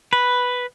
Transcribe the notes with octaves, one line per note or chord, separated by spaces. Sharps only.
B4